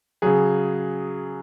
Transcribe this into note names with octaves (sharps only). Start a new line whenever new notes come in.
C#3 F#3 G#4